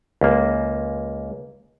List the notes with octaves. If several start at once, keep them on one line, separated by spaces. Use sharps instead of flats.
C#2 A#3